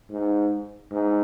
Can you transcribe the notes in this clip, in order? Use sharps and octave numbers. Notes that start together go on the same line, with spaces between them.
G#2
G#2